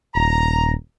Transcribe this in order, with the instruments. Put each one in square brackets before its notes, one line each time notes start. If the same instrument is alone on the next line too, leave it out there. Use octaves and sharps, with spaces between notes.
[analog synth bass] D#1 [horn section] A#5